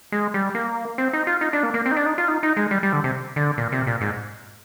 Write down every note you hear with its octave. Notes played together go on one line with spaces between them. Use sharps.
G#3
G3
A#3
C4
D#4
F4
D#4
D4
A#3
A#3
C4
D#4
D4
D#4
F4
D#4
D#4
G#3
G3
G3
D3
C3
D3
A#2
C3
A#2
G#2